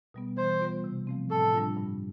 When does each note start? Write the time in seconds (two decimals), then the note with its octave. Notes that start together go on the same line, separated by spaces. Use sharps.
0.14 B2 G3 B3
0.37 E3 C5
0.61 G3 B3 F4
0.84 C3
1.07 F3 A3 C4
1.30 A2 A4
1.53 G3 D4 F4
1.77 G2